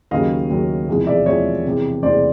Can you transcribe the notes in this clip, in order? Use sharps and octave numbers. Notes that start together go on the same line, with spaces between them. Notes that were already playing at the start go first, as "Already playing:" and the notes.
D#2 C#3 F#3 D#5 F5
D#2 C#3 F#3
E1 E2 C3 F3 G#3
D5 E5
E1 E2 C3 F3 G#3 C#5 D#5
E1 E2 C3
E1 E2 C3 C5 D5